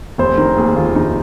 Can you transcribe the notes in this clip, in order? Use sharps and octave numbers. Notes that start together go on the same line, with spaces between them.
F1 C5
D#3 A#4
D#2 G#4
D#2 F4
F1 D#4